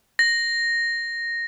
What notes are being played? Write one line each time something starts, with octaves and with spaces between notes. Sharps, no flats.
A#6